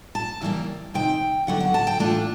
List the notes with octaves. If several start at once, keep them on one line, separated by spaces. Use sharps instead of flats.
A5
C#3 E3 G3 A#3
C3 D#3 G5
D3 F#3 B3 F#5
F#5
A5
G5
A2 E3 A3 D4 F4 A5